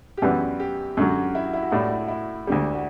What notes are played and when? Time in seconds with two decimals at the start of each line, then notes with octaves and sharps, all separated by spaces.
0.17 G4
0.22 F#2 E3 G3 B3 D4 F#4
0.60 G4
0.97 F#2 D3 F#3 F#4
1.35 E4
1.44 F#4
1.53 E4
1.62 F#4
1.71 A2 G3 D4 E4
1.80 F#4
1.90 E4
1.99 F#4
2.08 E4
2.47 D2 D3 G3 D4
2.73 F#4